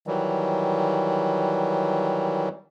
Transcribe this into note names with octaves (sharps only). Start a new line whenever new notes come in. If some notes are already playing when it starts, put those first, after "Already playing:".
D#3 E3 F#3 G3